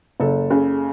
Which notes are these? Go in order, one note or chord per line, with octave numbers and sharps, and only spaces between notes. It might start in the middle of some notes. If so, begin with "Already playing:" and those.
F#1 A4
C#3